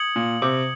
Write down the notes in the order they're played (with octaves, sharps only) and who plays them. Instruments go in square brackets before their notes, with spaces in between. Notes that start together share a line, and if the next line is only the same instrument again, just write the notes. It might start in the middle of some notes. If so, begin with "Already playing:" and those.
Already playing: [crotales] D#6 G#6 C#7 F#7
[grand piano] A#2
C3